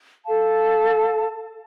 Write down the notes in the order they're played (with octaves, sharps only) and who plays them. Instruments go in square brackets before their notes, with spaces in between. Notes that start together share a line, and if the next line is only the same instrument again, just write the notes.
[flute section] A4 F5 A5